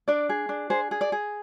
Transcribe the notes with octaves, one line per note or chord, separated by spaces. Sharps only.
D4 D5
G#4
D4
G#4 C5
G#4
D5
G#4